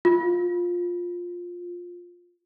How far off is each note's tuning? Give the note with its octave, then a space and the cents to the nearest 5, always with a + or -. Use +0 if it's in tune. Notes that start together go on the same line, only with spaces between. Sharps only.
F4 +10